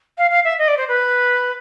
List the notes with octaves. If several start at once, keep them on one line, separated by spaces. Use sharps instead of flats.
F5
F5
E5
D#5
D5
C5
B4